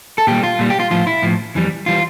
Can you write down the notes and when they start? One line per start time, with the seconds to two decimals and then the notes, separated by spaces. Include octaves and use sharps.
0.18 A4
0.27 A#2 G3 G4
0.43 F4
0.59 A#2 G3
0.70 G4
0.80 F4
0.91 A2 F3 F4
1.07 E4
1.22 A2 F3
1.55 F2 E3 G3
1.86 E3 G3 F4